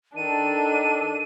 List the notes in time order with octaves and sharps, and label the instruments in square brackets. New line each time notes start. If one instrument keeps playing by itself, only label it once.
[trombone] D#3 [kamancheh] D4 A4 [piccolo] D#7